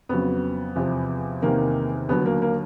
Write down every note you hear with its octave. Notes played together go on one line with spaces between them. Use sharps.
F2 C#3 F#3 B3
E2 C3 F3
E2 C3 D#3 A#3
D#2 D3 F#3 B3
A#3
A#3